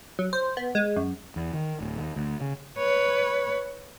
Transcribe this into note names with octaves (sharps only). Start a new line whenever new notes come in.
F#3
C5
B3
G#3
F#2
E2
D#3
D1
D#2
D2
C#3
B4 C#5